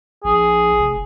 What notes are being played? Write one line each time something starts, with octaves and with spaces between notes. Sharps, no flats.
A#1 G#4
F1